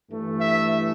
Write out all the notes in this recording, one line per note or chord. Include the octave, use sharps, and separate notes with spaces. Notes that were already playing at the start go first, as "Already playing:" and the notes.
G2 E3 A3
E5